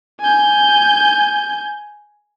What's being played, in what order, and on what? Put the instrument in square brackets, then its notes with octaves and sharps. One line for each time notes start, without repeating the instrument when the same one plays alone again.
[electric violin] G#5 G6